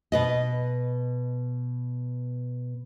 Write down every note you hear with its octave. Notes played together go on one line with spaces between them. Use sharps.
B2 B4 D#5